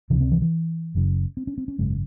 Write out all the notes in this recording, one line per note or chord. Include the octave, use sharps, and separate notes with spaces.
C#2 C3 E3
C4
E3
E3
F#1 F#2 C#3
C4
C#4
C4
C#4
G#1 F#2 C#3 G#3